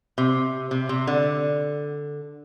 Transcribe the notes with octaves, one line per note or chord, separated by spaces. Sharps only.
C3
C3
C3
D3